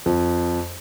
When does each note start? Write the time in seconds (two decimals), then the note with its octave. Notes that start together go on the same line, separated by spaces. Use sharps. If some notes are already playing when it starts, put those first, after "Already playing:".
0.06 F2